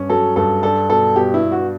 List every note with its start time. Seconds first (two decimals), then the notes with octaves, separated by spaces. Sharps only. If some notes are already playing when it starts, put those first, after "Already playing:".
Already playing: G2 C#4
0.10 F#3 A4
0.36 G2 A4
0.63 D4 A4
0.90 B2 A4
1.16 B2 G4
1.34 E4
1.42 B2
1.52 F#4